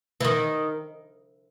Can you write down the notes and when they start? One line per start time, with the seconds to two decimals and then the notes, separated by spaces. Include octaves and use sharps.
0.21 E3
0.24 D#3